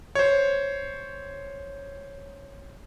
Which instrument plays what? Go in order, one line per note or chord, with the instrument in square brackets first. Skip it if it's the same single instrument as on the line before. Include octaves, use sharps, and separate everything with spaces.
[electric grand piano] C5 C#5